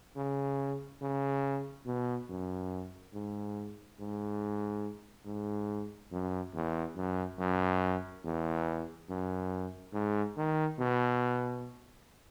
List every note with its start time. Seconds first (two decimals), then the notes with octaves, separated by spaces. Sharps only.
0.16 C#3
1.01 C#3
1.86 B2
2.29 F#2
3.13 G#2
3.99 G#2
5.26 G#2
6.12 F#2
6.54 E2
6.96 F#2
7.38 F#2
8.24 E2
9.09 F#2
9.93 G#2
10.37 D#3
10.79 B2